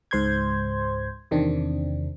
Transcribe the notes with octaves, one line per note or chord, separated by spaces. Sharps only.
C#2 G#2 C5 C6 G6 G#6
E2 C3 D#3 C4 D4